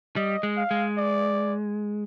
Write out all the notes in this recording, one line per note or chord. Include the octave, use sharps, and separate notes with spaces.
G3 D#5
G#3
F5
G#3
D5